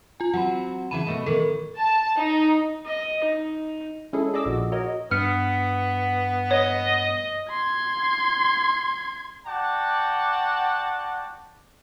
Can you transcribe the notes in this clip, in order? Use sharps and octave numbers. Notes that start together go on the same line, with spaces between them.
F4 G#5
F#3 C4 F#5 B5
C#3 E3 A5 B5 D#7 E7
B2 A3 D#5
A2 D#3 A4
A5
D#4
D#5
D#4
G#3 C#4 E4 G#4 A4
G#4 D5 D#5 D6 E6
A#1 A#2 F#4
F#4 A#4 C#5 D#5
G2 B3 F6 C#7
C#5 D#5
C6 G#6
F#4 D5 F#5 G5 A5 D6